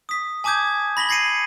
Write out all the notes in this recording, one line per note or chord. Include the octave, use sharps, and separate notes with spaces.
D#6 B6
G#5 A5 D6 D#6 G6 G#6
B5 A#6 B6 F#7 G7
G#6 A#6 C7 C#7 D#7